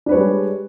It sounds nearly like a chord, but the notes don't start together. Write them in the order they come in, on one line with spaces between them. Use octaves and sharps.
D4 B4 C#5 G#3 G3